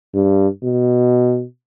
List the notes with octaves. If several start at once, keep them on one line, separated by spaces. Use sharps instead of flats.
G2
B2